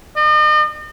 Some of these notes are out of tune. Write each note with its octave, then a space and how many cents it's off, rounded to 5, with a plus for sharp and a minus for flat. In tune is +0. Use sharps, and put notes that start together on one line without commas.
D#5 -40